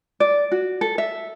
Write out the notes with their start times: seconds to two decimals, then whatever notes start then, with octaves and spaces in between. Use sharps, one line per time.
0.20 D5
0.52 F#4
0.81 A4
0.98 E5